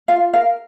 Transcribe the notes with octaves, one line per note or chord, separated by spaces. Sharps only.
F4 F5
A#4 F5